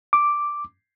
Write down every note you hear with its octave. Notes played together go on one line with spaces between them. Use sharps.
D6